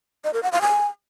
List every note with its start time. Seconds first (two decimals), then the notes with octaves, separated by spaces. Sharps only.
0.24 D#5
0.34 A#4
0.43 F#5
0.52 F5
0.61 G#5